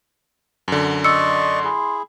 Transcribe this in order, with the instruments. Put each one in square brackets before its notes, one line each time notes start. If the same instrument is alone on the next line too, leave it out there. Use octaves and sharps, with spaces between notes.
[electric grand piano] F#2 D3
[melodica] D5 D#5 C#6 [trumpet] C6 [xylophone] E6 C#7
[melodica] E4 G#4